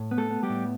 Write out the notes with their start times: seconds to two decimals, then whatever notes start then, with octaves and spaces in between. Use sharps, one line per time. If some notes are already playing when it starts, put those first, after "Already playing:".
Already playing: A2
0.11 B3
0.18 A3 A4
0.30 B3
0.43 G3 G4
0.49 A2